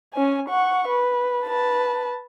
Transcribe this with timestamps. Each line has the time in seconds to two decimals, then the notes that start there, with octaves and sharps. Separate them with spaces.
0.14 C#4 G#5
0.48 F#5 C#6
0.89 B4
1.46 B4 A5